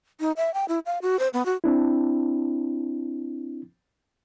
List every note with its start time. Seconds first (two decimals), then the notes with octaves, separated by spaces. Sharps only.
0.20 D#4
0.37 E5
0.54 G5
0.68 E4
0.86 F5
1.02 F#4
1.19 C5
1.34 B3
1.46 F#4
1.64 C4 D4 E4